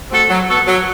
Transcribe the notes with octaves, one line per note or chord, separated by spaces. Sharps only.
A3 C4 F#4 A4
F#3
B3 F#4 A4
F#3